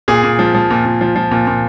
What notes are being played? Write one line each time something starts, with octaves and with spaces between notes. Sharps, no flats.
A#2 G#4
A#2
F3
F3
A#2
A#2
F3
F3
A#2
A#2